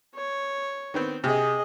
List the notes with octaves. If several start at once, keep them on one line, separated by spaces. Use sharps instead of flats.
C#5
D#3 B3 C4
C3 G#4 D#5